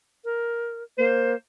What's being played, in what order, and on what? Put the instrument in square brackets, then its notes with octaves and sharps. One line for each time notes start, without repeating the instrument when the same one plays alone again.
[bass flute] A#4
[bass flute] A#3 [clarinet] C5